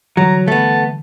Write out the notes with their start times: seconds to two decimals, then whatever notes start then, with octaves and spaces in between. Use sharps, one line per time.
0.17 D3 E3 F#3 G3 A#5
0.48 A3 B3 A5